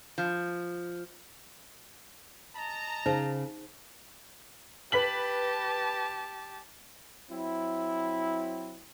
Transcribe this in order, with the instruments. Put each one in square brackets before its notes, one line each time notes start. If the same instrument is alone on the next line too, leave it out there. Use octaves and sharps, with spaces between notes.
[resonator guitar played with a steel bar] F3
[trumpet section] D#5 A5 A#5
[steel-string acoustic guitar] C#3 [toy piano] D#4 C5
[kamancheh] G4 A5 [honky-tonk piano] B4 B6 F#7
[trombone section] F#3 C4 E4